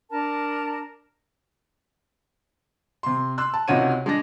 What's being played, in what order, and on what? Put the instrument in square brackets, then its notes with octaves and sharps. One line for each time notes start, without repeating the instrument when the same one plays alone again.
[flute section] D4 A#4 A5
[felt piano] C3 C6
C6 E6 F#6
A5
C#2 C3 D#4 F#4 C#5 D#7
G#3 D4 A#6